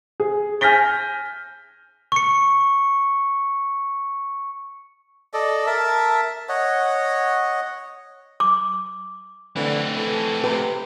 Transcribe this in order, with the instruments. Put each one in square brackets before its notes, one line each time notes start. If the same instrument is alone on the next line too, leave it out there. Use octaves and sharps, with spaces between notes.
[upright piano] G#4
G#5 F6 G6 A#6 B6 G7
[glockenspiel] C#6 C#7
[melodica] A4 D5 D#5
A#4 E5 A5
C#5 D#5 F#5
[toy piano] D6
[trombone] D3 [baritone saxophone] E3 [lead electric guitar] A3 C4
[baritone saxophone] E3 [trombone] A4
[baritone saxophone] C3 [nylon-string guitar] B4